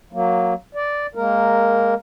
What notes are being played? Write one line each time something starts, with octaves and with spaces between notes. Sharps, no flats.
F#3 A#3
D5
G#3 A#3 A#4